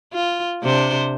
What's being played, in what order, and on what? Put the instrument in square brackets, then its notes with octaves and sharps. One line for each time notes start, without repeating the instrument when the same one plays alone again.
[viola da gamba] F4
C3 D4 C5